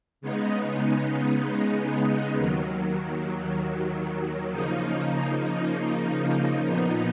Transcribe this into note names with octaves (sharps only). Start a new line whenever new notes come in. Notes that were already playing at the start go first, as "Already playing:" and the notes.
C#3 G#3 B3 D#4
D#2 D#3 F#3
C#3 F3 A#3 D#4
A#2 F3 B3 D#4